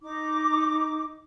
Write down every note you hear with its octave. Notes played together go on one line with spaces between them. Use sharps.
D#4 D6